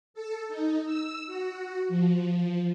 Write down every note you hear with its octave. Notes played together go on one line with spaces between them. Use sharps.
A4
D#4
E6
F#4
F3